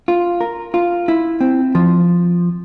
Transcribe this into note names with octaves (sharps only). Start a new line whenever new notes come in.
F4
A#4
F4
E4
C4
F3